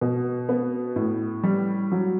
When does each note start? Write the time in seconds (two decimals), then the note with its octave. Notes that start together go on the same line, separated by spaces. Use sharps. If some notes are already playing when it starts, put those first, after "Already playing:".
0.01 B2
0.49 B3
0.96 A2
1.44 G3
1.92 F#3